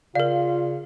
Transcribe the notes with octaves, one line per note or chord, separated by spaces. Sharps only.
C#3 F4 A#4 D5 F5